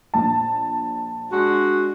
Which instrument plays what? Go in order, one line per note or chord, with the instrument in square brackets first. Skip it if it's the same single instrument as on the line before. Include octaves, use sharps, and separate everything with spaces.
[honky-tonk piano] A#1 A5
[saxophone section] G#3 D4 F#4